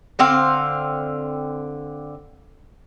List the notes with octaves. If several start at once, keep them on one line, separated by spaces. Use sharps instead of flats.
D3 C4 F5